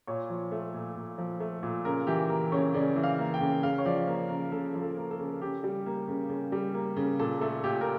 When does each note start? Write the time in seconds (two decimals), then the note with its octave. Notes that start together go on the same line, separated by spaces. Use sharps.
0.07 A#2 C#5
0.30 F3
0.52 A3
0.74 A#2
0.96 A#2
1.18 F3
1.40 A3
1.63 A#2
1.85 C#3 A#4
2.07 E3 G4
2.29 A#3 A#4
2.52 C#3 C#5
2.74 C#3 D5
2.96 E3
3.03 F5
3.19 A#3
3.34 G5
3.41 C#3
3.63 C#3 F5
3.78 C#5
3.85 F3 D5
4.08 A#3
4.29 C#3 A#4
4.52 C#3 A4
4.75 F3
4.82 A4
4.97 A#3
5.11 A4
5.19 C#3
5.42 C#3 G4
5.64 G3
5.86 A#3
6.08 C#3
6.29 C#3
6.52 G3
6.74 A#3
6.97 C#3
7.19 A#2 A4
7.41 A3 A4
7.64 A#2 G4
7.81 A#4